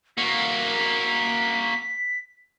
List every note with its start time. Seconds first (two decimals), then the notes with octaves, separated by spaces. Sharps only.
0.18 A#3 F#4 B6